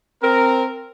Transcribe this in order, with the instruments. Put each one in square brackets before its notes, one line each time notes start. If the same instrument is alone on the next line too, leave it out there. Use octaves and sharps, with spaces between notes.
[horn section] C4 A#4